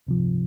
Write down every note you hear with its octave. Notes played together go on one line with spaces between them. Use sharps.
C#2 C3 F3